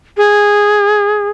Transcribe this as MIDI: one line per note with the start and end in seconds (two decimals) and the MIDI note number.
0.17 1.30 68